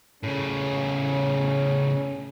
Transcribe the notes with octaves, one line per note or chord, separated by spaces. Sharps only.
A2 C#3 C#4